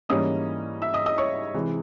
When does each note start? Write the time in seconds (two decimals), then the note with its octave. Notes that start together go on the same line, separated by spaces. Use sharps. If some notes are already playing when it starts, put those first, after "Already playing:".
0.09 G#2 E3 G3 A#3 C#4 D#5 D#6
0.82 E5 E6
0.94 D#5 D#6
1.06 D#5 D#6
1.18 C#5 C#6
1.54 C3 E3 G#3 C4